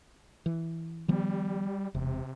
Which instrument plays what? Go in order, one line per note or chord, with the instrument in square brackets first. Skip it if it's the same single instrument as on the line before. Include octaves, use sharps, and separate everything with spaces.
[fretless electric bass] E3
[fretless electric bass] D#3 F3 B3 [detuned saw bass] G3
[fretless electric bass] E1 [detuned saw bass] C3